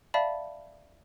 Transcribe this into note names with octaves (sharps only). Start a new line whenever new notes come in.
D5 E5 F5 A5 B5